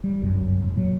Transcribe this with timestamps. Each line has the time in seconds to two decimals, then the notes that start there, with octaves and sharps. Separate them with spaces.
0.04 G3
0.22 G1 C2 F#2
0.61 F1
0.76 A#2 F#3